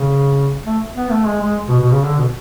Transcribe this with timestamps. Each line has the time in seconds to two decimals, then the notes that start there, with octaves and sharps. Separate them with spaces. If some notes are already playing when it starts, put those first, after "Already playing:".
Already playing: C#3
0.65 A3
0.95 B3
1.10 A3
1.26 G#3
1.42 G#3
1.68 B2
1.80 B2
1.92 C#3
2.03 D3
2.18 B2